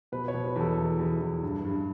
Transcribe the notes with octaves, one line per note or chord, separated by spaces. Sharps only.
B2 B4
C#5
B2
B4
E2 A4
E2
E2
E2
G2
G2